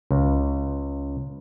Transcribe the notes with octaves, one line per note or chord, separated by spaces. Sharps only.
C#2